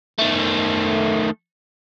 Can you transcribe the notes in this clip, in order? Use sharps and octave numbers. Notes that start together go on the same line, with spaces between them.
D#3 A3